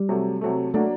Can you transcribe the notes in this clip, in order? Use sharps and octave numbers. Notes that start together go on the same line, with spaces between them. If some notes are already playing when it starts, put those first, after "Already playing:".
Already playing: G3
C3 F#3 A3
C3 F#3 A3
F#3 A3 A#3 D4 F#4